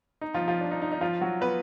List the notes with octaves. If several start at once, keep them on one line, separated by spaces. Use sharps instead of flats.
D#4
F3 F4
F3 F4
D4
D#4
D#4
D#4
F3 F4
F#3 F#4
B3 B4